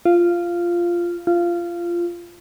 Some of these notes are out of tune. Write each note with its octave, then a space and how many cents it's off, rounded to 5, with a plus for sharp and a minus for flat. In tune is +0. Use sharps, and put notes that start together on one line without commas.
F4 -10
F4 -15